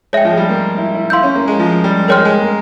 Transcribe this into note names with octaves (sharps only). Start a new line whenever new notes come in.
G#3 C#5 E5 G5
F3
G#3
G3
A#3
E4
E4
E4 F5 C6 E6 G6
C#4
A#3
G#3
F3
G3
G#3 A#4 C#5 G5 C6 F6
G#3
A#3